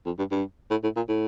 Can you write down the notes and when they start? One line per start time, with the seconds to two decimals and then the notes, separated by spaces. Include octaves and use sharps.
0.06 F2
0.18 G2
0.31 G2
0.71 A2
0.83 A2
0.96 A#2
1.08 A2